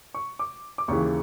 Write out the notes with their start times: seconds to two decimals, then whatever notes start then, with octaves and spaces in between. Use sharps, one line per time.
0.15 C#6
0.39 D6
0.78 D6
0.88 D#2 C#3 E3 C#6